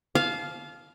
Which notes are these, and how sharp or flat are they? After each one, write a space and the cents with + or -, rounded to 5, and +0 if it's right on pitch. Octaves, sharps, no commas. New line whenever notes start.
F5 +0 A5 -35